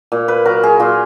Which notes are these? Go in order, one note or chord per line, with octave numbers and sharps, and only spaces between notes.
A#2
B4
F#3 A#4
G#4
A#2 F4